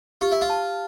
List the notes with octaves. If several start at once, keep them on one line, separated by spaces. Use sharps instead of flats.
F4 G4
E4
F4
A5